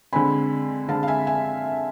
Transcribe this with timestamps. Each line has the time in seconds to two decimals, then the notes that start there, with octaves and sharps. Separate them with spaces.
0.13 D3 G#3 C4 G#5 B5
0.88 D3 G#3 C4 F5 A5
1.03 F5
1.08 E5 G#5
1.27 E5 G#5